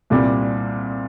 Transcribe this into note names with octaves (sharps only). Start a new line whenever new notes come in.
C2 A#2 G3 C4